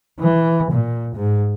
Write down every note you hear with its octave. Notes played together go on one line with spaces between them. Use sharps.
E3
A#2
G#2